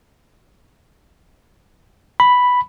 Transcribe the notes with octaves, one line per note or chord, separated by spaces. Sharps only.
B5